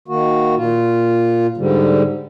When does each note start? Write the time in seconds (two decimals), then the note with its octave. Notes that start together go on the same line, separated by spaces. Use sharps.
0.08 D#3 A#3 F#4
0.56 A#2 F4
1.57 G#2 D3 G3